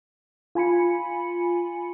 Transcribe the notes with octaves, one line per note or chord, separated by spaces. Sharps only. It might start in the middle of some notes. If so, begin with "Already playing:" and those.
F4 G#5 B5 C#7